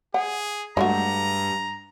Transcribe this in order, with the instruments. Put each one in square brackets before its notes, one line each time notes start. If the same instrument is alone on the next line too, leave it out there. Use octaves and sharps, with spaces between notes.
[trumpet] G#4 [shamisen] F#5
[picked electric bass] G2 [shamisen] G#3 A3 F#4 [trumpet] A#5